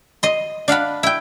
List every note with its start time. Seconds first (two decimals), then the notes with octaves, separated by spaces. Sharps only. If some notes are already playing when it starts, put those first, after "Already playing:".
0.23 D#5 C6
0.68 D4 F5 F#5 B5
1.03 E4 G5